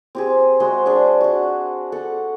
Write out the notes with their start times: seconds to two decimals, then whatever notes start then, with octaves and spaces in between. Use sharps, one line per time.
0.15 C4 G4 G#4
0.60 G#3 F#4 C5 C6
0.86 D4 G#4 E5
1.21 F#4 F#5
1.92 A4 F#5